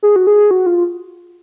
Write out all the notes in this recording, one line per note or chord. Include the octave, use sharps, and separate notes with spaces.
G#4
F#4
G#4
F#4
F4